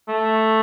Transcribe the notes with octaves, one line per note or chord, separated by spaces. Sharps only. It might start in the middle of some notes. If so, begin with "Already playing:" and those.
A3